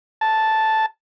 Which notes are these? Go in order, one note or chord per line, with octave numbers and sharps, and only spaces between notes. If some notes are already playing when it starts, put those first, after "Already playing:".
A5